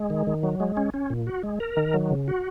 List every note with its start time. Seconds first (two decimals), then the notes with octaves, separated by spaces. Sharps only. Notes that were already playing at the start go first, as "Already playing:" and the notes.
Already playing: G#3
0.10 D#3
0.27 D#3
0.43 F#3
0.60 G#3
0.77 C#4
0.94 C#4
1.10 A#2
1.27 F#4
1.43 G#3
1.60 A#4
1.77 D#3
1.94 F#3
2.10 C#3
2.28 F#4